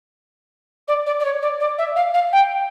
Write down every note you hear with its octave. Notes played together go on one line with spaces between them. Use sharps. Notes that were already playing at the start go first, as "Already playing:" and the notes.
D5
D5
D5
C#5
D5
D5
E5
F5
F5
G5